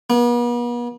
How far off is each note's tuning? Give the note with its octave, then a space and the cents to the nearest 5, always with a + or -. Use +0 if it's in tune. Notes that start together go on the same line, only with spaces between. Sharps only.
B3 -45